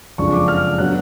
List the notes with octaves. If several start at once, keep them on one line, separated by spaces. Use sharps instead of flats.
F#1 F2 F3 G#3 D4 C#6
D6
F6
D3 F#3 B3 D4 F#6